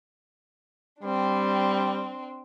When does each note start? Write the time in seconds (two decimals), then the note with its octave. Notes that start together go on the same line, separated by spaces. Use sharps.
1.03 G3 C4 D4